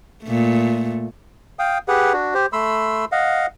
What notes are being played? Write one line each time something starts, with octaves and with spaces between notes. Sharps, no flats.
A#2 A3
F5 G5 D#6
G4 G#4 B4 F#5
D4 F#4
G4 C5
A3 B5 C6 E6
D#5 F5 F#5